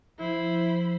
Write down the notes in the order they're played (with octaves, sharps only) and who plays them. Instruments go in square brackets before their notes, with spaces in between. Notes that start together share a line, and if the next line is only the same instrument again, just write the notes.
[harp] F3 [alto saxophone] E4 [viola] C5 B5